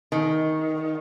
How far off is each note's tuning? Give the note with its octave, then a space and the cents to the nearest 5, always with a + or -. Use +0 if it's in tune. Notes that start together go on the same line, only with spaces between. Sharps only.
D#3 +15